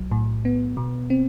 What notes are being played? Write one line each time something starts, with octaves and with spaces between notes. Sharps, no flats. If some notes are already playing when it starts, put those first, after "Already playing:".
Already playing: B1 F#3
A2
B3
B2
C4